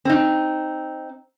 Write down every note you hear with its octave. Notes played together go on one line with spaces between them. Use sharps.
C4 D#4